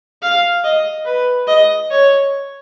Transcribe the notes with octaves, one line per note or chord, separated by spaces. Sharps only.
F5
D#5
B4
D#5
C#5